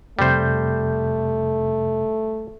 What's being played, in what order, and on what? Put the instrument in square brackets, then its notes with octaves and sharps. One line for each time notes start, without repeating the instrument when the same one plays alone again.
[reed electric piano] F2 C3 G6 [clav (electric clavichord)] G3 C5 [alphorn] A3